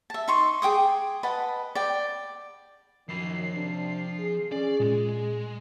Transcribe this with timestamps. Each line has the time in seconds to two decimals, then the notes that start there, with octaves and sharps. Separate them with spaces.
0.10 E5 A5
0.28 D#4 C6 C#6
0.62 G#4 G5 D6 D#6
1.23 B4 D#5 F#5 A5
1.75 D5 G5
3.09 F#2 D#3 F3 B5 C7
3.54 C3 D4
4.18 G#4
4.52 C#4 G#4 D5
4.80 A#2 G#3